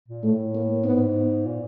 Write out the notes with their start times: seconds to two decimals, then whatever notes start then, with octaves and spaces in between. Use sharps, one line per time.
0.08 A#2
0.24 A2 A3
0.55 A#3
0.84 G#2 B3
1.46 A#2